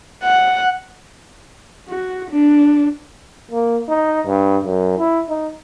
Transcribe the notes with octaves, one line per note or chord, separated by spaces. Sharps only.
F#5
F#4
D4
A#3
D#4
G2
F#2
E4
D#4